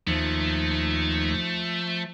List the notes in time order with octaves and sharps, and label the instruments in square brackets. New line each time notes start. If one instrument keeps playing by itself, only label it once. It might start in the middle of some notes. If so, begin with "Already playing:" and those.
[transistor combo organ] D#2 [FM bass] F3 [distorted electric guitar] A3